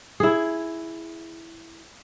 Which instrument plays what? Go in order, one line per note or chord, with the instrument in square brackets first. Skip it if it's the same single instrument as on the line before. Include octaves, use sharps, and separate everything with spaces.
[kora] E4 G#4